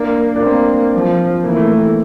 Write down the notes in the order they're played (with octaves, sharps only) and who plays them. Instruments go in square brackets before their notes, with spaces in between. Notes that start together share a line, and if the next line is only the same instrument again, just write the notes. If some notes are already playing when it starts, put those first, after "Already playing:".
Already playing: [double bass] A#3 [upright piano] D4
[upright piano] D4
[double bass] A#3 [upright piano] C4
[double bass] F3
[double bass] E3 [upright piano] A#3
[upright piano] A3
A#3
A3